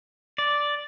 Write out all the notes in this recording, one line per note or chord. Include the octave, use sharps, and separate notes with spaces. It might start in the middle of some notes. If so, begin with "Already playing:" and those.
D5